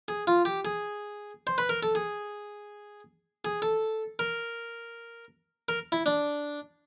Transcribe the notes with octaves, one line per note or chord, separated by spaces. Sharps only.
G#4
F4
G4
G#4
C5
B4
A#4
A4
G#4
G#4
A4
A#4
A#4
E4
D4